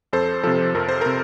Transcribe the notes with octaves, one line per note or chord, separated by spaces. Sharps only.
F2 A4 C5
C3 F3 A4
F2 A#4
C5
C3 A#4